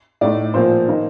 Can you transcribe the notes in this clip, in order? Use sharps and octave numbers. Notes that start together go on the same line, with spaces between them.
A2 A3 D#4 D5
A#2 F3 A#3 C5
D#3 A#3 D#4